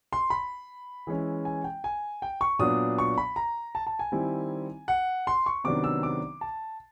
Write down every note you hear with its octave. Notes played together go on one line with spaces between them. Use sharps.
C6
B5
E3 G#3 C#4 E4
G#5
G5
G#5
G5
C#6
A#2 F#3 B3 D4 D#6
C#6
B5
A#5
A5
A5
G#5
D#3 G3 C4 E4
F#5
C6
C#6
C3 D#3 F#3 B3 D4 D6
E6
D6
A5